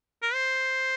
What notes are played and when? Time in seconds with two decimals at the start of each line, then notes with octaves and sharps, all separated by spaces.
0.22 A#4
0.34 C5